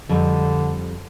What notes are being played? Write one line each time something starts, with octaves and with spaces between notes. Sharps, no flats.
F2 D3 G3